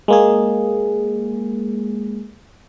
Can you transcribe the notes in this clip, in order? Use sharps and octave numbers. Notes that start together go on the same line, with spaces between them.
G#3 A#3 G#4